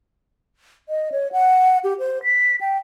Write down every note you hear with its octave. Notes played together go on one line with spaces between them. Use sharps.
D#5
C#5
F#5
G4
C5
B6
G5